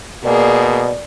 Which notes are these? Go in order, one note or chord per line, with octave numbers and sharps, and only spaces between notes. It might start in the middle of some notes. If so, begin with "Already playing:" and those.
B2 A#3 G#4 D5